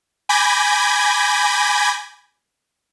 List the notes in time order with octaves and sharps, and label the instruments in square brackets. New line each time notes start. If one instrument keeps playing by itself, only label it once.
[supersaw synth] G#5 B5 D6 G6 G#6 A#6